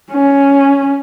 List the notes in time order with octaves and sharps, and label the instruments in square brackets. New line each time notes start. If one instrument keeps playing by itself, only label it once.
[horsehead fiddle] C#4